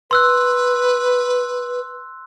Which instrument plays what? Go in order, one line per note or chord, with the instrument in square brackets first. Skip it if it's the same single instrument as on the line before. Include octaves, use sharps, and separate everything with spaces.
[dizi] B4 [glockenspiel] C6 E6 F#6